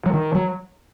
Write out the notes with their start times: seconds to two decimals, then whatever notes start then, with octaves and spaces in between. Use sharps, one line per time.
0.06 F#3
0.13 D#3
0.35 F#3